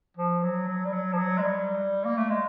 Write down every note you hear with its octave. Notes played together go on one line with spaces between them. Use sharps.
F3
F#3
F#3
G3
F#3
F3
F#3
G#3
G3
A#3
A3
G#3